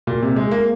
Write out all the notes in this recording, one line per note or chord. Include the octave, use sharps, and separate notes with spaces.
A#2
C3
G#3
A#3